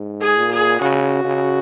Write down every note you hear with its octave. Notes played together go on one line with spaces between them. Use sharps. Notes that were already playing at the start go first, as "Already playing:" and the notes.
Already playing: G#2
G#4
A#2
G#4
C#3 F#4
C#3